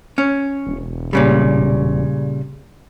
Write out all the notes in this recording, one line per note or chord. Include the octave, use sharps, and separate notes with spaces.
C#4
E1
A#2 C#3 G3